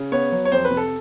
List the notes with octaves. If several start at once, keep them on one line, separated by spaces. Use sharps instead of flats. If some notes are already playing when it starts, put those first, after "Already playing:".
Already playing: C#3
B3 C#5
F#3
C#5
F2 C5
B4
C3
A4